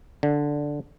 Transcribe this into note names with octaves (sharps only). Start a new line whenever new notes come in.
D3